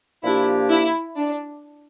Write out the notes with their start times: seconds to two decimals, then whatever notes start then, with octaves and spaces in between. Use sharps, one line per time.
0.23 A#2 F3 A#3 D4 E4 G4
0.70 E4
1.16 D4